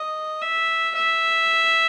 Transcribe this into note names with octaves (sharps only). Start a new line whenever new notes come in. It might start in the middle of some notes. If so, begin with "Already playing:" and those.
Already playing: D#5
E5
E5